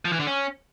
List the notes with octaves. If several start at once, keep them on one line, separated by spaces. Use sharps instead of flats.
F3
E3
D3
C#4